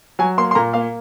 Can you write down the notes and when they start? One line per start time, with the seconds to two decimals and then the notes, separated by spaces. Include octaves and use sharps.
0.19 F#3 G#5
0.38 A#3 C6
0.51 C6
0.55 A#2 A#5
0.73 A#3 F5